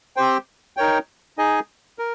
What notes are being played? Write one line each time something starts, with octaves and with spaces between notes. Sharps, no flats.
C4 G4 C5 G5
D#4 A#4 C#5 G5
D#4 G#4 D#5 G#5
A#4